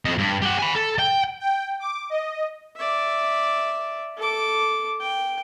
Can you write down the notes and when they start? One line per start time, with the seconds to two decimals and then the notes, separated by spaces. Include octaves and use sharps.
0.05 F2 D#5
0.18 G2
0.42 G4 F#5
0.59 G#5 B5
0.76 A4
0.99 G5
1.40 G5
1.80 D6
2.10 D#5
2.76 D5 E5
4.17 A4 D6
5.00 G5